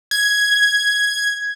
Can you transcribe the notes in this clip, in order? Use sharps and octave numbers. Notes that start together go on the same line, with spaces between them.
G#6